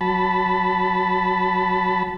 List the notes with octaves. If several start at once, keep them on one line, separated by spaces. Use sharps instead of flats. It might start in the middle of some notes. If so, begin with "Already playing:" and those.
F#3 A5 B5